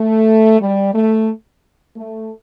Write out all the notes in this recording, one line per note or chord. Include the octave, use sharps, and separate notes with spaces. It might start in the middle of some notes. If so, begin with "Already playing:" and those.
Already playing: A3
G3
A3
A3